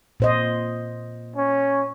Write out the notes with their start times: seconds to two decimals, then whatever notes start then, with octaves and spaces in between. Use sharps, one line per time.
0.20 A#2 C5 D#5
1.36 C#4